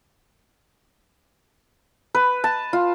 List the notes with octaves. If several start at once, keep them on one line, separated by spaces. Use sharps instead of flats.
B4
A5
F4